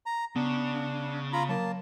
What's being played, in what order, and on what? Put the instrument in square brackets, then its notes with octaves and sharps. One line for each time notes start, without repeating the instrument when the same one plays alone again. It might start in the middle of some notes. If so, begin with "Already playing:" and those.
[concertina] A#5
[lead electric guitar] C#3 [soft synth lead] B3 [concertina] D4
[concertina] F4 A#5 B5
[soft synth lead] F#3 [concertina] A#3 A5